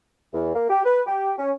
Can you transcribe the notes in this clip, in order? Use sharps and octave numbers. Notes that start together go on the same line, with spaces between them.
E2
A#3
G4
B4
G4
C#4